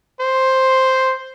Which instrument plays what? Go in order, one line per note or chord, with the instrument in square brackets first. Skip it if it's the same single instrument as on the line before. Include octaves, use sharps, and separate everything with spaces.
[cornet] C5